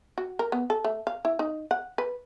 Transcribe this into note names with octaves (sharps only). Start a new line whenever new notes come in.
F#4
A#4
B3
A4
A3
F5
E4
D#4
F#5
B4